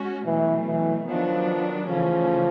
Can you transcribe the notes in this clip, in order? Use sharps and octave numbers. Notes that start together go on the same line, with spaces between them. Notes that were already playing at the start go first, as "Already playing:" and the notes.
Already playing: G#3 C#4 F#4
B2 E3 F#3 A3
E3
D#3 F3 F#3 B3 D4
C#3 E3 F3 A3 C#4